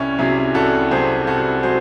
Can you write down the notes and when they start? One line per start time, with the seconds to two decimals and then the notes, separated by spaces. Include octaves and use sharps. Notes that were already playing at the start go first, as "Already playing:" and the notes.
Already playing: C2 C#4 E4
0.19 C3 F#3 E4 G#4
0.54 C2 F#4 A4
0.91 C3 F#3 G#4 C5
1.27 C2 F#4 A4
1.63 F#3 G#4 C5